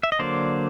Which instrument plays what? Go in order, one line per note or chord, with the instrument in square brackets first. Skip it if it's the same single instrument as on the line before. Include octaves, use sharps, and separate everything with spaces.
[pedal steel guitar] E5
D#5
D3 F#3 A#3 C5 D5